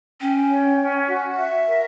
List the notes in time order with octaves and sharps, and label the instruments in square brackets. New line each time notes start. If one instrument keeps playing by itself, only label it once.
[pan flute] C#4 [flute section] G5
[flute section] C#5
C#4
F#4
E5
A#4